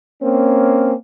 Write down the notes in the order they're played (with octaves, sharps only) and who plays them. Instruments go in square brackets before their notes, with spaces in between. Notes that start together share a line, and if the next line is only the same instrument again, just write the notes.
[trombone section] A#3 C4 C#4